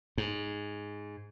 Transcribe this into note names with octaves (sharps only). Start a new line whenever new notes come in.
G#2